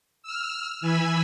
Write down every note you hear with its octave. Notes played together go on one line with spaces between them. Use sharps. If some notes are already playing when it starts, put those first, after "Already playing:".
E6 F6
E3 G#5 B5 E6